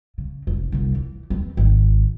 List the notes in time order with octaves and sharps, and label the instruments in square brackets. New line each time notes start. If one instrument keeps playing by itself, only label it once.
[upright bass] C#3
F1
F1 C2
E3
E2 C4
G#1